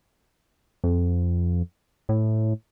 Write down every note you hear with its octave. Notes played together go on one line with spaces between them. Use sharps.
F2
A2